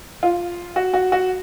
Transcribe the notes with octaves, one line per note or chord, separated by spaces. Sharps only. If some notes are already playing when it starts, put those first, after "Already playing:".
F4
F#4
F#4
F#4